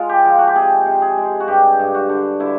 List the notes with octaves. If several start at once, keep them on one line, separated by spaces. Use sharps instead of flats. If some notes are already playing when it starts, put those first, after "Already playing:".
Already playing: G#3 F4
G4
F3
F#4
G4
C3 G#4
C3
G#4
G#3
F#4
G2 G4
G2
F#4
D3
D3 E4